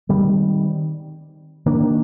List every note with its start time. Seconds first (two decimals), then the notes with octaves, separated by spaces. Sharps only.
0.09 D#3 G3 C4
1.66 D#3 A#3 D4